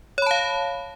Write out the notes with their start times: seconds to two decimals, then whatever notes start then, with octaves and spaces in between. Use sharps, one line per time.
0.18 C#5
0.22 B5
0.26 A5
0.31 F5